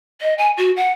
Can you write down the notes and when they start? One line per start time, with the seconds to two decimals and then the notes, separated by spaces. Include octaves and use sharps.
0.21 D#5
0.38 G#5
0.57 F#4
0.76 F#5